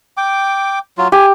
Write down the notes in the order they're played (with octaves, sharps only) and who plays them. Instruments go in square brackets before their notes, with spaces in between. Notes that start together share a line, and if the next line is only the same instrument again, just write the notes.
[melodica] G5 D6
F#3 F4
[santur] G4 [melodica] G#5